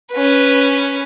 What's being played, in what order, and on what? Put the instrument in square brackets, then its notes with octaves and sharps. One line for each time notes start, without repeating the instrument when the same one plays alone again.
[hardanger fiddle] C#4 B4